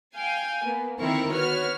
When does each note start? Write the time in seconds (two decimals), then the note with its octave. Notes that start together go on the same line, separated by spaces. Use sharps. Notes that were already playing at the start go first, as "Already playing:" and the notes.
0.16 F5 G5 G#5
0.65 A#3 B3
0.98 D3 D#3 C4 E4 A#4 C#6
1.33 B3 F#4 C#5 F6